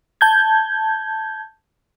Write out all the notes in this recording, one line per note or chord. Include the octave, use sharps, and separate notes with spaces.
A5 G6 G#6